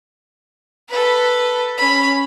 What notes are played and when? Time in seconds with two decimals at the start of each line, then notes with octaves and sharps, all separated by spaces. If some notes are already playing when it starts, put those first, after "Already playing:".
0.89 A4 B4
1.77 C#4 B5